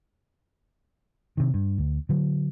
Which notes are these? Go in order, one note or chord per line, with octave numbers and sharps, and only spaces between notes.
C3 D#3
G2
D2
D3 F#3